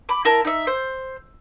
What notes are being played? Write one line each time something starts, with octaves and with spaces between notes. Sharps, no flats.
B5 D6
E4 A#4 A5
D#4 E5
C5